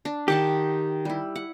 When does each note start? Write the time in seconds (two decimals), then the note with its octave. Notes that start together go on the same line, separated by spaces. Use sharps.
0.05 D4
0.28 D#3 G4 F#5 A5
1.05 G3 E4
1.36 F#5